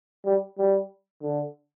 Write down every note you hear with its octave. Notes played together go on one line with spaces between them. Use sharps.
G3
G3
D3